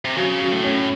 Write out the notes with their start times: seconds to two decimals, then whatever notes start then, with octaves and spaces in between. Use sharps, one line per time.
0.05 C3
0.17 C#3 F#3
0.41 F#3
0.52 A2
0.64 C#4